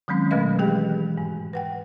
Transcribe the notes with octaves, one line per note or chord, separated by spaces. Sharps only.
D#3 F#3 G#3 C4 C#4
B2 F#3 A3 B4 D#5 F5
E3 G#3 G4 G#4 G5
G#2
B4 F#5 G5